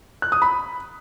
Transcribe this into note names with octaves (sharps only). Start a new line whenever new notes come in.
F#6
D#6
B5